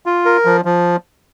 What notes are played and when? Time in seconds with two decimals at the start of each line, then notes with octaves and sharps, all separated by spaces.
0.06 F4
0.25 A#4
0.45 F3
0.65 F3